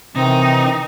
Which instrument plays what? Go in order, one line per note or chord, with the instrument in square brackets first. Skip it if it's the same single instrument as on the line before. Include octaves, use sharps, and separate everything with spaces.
[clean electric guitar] C3 [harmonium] D#3 E3 C4 [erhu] D#4